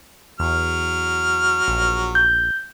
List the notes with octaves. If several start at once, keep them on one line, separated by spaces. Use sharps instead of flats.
E2 F#3 F6
A#1
G6